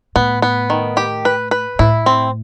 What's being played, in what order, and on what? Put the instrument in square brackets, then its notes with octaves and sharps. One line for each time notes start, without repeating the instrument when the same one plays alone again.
[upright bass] A2 [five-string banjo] B3
[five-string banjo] B3
D#3
G4
B4
B4
[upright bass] A2 [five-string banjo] E4
[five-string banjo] C4